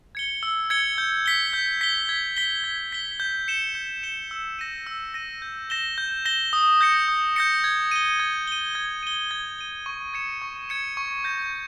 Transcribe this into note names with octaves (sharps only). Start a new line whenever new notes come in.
G#6 C#7 G7
E6
G#6 C#7 G7
G6
B6 G7
G6
B6 G7
G#6
B6 G7
G#6
B6 G7
G6
C#7 E7 G7
G6
C#7 E7 G7
E6
A#6 D#7
E6
A#6 D#7
G6
A#6 E7 G7
G6
A#6 E7 G7
D#6
G6 A#6 C#7
D#6
G6 A#6 C#7
G#6
D#7 G7
G#6
D#7 G7
G#6
D#7 G7
G#6
D#7 G7
C#6
G#6 C#7 E7
C#6
G#6 C#7 E7
C#6
G6 A#6